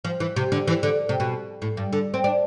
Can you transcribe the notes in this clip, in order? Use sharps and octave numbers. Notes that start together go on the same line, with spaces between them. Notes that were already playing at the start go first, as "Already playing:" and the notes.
F3
E3
C3
D3
E3
D3
C3
B2
A2
G2
D3
C4
D4